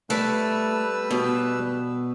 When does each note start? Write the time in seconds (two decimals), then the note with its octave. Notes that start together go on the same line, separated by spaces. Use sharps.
0.10 G3 A3 B4 E6
1.11 B2